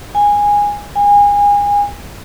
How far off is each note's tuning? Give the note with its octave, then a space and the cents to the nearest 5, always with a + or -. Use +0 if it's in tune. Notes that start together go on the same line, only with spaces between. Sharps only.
G#5 -15
G#5 -30